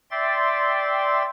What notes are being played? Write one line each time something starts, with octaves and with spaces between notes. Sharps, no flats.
D5 E5 G5 C6 A6